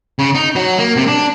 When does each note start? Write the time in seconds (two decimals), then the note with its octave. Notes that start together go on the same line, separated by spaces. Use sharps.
0.19 C#3
0.35 D#4
0.56 F#3
0.78 A#3
0.96 C3
1.08 D4